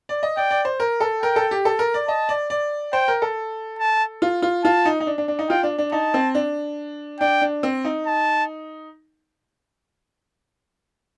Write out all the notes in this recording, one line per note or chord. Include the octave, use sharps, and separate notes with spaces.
D5
D#5
D5 G5
D5
C5
A#4
A4
A#4 G5
A4
G4
A4
A#4
D5
D#5 A5
D5
D5
C5 G5
A#4
A4
A5
F4
F4
F4 A5
D#4
D#4
D4
D4
D4
D#4
F4 G5
D4
D4
D#4 A5
C4
D4
D4 G5
D4
C4
D#4
A5